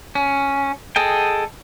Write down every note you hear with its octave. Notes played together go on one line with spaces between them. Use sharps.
C#4
G#4 A4 D#5 G5